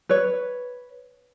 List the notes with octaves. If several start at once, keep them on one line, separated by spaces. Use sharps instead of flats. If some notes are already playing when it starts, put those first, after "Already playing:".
B4 C#5